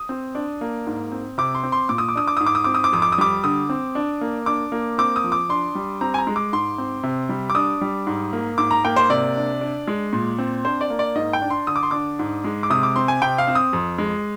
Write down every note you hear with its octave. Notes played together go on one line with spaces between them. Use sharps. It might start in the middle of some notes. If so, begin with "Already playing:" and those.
Already playing: D#6
C4
D4
A#3
G#2
C4
C3 D6
C6
C4
C6
A#2 D6
D#6
D6
D4 D#6
D6
G#2 D#6
D6
D#6
C4 D6
D#6
D6
F2 D#6
D6
D#6
G3 D6
D3 D#6
C4
D4
A#3
D4 D6
A#3
C4 D6
D#6
F3
D6
D4 C6
G3
C4 A#5
G#5
A#5
G#3
D6
G#2 C6
C4
C3
G3
D6
D4 D#6
G3
G#2
A#3
G#2 D6
A#5
A#3 G5
C5
C3 D5
D4
D4
G#3
A#2
C4
D4 C5
D5
A#3
D5
G#2 D#5
G5
D4
C6
D3 D#6
D6
C6
D4 D6
G#2
G#3
D6
C3 D#6
D6
C4 C6
G#5
C3 G5
F5
C4
D#6
F2
G#3